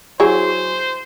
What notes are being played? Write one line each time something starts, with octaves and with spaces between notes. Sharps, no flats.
F#3 E4 G#4 C5